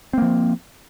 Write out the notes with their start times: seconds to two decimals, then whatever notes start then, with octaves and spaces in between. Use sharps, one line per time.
0.13 C4
0.18 A#3
0.22 F3